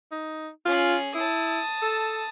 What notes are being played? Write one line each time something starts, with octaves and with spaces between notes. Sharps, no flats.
D#4
C#4 F4 G#4
E4 A5 D#6
A4